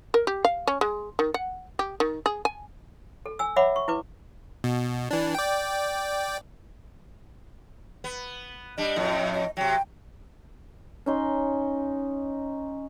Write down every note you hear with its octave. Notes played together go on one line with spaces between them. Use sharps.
A#4
G4
F5
C#4
G#3
D#3
F#5
G4
D#3
G#4
G#5
A4
G#5 E6
C#5 E5 F#5 B5 D6
C#6
E4 B4 D6
B2
E3 D4
D5 G5
B3
G3 D4 D#5
F2 A2
D#5
C3 F#3 G5
C#4 D#4 C6